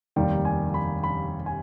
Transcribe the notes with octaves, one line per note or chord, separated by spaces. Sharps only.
F1 D#2 D#3 G3 G5
G#5
B5
B5
G#5